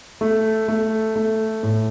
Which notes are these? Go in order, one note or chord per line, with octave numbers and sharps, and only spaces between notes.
A3
A3
A3
A2